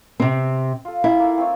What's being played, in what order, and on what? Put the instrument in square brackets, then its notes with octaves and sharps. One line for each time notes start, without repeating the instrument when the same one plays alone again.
[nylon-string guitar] C3 C4
[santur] F4 A4
[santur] D#4 F5 G5 [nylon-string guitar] E4
[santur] A#3 A4
C4 C#5